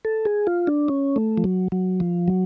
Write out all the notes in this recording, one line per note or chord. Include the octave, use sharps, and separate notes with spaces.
A4
G#4
F4
D4
C#4
A3
F3
F#3
F#3
F3
F#3